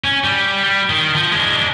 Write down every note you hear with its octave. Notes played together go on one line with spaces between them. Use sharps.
C#4
G3
G3
D#3
F3
G#3 D4